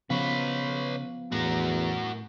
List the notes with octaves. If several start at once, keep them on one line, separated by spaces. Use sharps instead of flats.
C#3 F3 B3 B4 C#5 F5
E2 A2 F#4 A#4